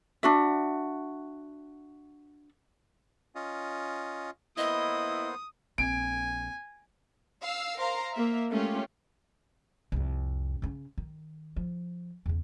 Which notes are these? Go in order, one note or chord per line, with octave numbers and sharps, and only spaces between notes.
D4 F#4 E5
C#4 F4 D#5
A#3 B3 E4 C5 D#5 D#6
A#1 C4 G#5 D7
F5 E6
A#4 C5 F5 A#5
A#3 E5
G#3 A3 C#4 F4 G4
C2 F2
C#3 C#4
D#3
F3
E2 C#3